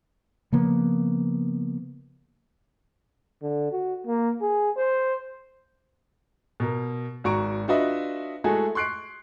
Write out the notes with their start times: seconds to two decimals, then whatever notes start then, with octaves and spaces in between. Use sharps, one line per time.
0.52 C#3 F3 A#3 B3
3.43 D3
3.72 F#4
4.07 A#3
4.41 G#4
4.77 C5
6.60 B2 A#4
7.24 G#1 F#4 A#5 C#6 D7
7.68 D4 F4 F#4 B4 D#5 E5
8.44 G#3 A3 E4 F#4 G#4 A4
8.75 C6 C#6 F#6 C7 D7